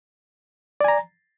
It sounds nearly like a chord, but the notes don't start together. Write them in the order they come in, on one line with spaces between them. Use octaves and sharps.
D5 G#5 A#5